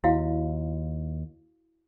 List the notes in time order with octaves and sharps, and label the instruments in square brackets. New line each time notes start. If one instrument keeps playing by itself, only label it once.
[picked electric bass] D#2 [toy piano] E4 F#4 F5